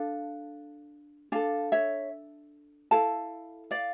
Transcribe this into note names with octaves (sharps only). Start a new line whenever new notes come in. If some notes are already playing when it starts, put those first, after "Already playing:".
Already playing: D4 A4 F5
D4 A4 F5 A5
C#5 E5
E4 A4 F5 A5
D5 F5